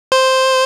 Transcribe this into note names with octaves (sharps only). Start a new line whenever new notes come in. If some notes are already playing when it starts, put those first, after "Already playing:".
C5